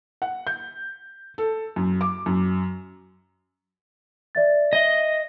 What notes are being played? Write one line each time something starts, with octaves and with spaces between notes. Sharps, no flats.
F#5
G6
A4
F#2
D6
F#2
D5 E5 A6
D#5 E5 G7